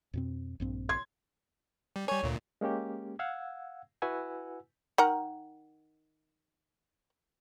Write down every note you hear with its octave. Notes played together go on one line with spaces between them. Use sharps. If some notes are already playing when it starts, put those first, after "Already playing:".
F2 B2 C4
A#1 G2 C4
C6 G#6
G3
G3 C#5 G#5
D2 A#2
G#3 A#3 C#4 G4
F5 F#5 E6 G#6
E4 F#4 B4 F#5 G#5 E6
D#3 F#5 A#5